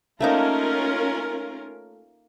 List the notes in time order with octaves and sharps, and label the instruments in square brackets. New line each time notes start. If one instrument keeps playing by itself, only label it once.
[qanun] A3 A#3 D#4 [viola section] C#4 F4 A#4